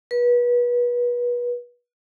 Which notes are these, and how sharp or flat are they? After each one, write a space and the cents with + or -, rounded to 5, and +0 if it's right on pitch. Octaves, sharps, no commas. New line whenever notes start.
B4 -30